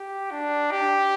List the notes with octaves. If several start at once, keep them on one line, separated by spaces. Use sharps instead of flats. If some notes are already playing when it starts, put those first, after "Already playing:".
Already playing: G4
D4
G4